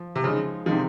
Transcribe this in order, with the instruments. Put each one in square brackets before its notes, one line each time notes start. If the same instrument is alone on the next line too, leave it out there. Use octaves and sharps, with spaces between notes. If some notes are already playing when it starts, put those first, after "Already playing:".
Already playing: [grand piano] F3
[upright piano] C3
[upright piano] C#3 [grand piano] F3 G#3 D#4
[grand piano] C3 D#3 G#3 D#4 [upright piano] F3